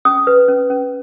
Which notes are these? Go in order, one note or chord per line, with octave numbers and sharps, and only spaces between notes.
C#4 D#6
B4
C#4
C#4